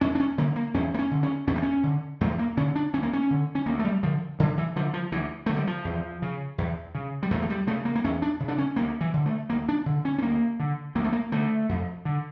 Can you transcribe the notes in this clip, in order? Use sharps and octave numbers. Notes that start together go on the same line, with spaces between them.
E2 C#4
D4
C#4
D3 A#3
A#3
E2 C#4
A#3
C#4
D3
C#4
E2 C#4
A#3
C#4
D3
E2 A3
A#3
D3 C#4
D4
D2 C#4
A#3
C#4
D3
C#4
D2 A#3
A3
G3
D3 F3
D2 D3
E3
D3 F3
F3
D2 E3
D3 A3
G3
F3
E2
C#3
E2
C#3
G3
E2 A3
A3
G3
C#3 A3
A#3
A#3
E2 C#4
D4
C#3
D4
C#4
D2 A#3
E3
D3
A3
D2 A#3
D4
D3
C#4
C#4
D2 A#3
D3
D2 A#3
A3
A#3
D3 A3
F2
D3